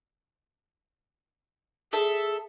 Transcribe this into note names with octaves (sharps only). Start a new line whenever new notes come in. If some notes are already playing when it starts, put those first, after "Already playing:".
G#4 A4 E5